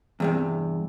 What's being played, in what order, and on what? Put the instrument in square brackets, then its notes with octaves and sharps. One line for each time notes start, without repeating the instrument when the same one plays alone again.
[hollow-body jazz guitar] E2 G2 C3